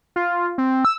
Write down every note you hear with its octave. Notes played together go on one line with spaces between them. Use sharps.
F4
C4
E6